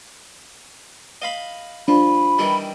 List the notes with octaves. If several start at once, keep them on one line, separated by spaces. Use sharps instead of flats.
D#5 F5 B5
F3 D4 B5
D#3 E3 G3